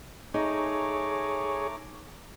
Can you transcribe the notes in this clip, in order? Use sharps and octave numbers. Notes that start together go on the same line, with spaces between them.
A3 D#4 G#4 C#5 A#5 D6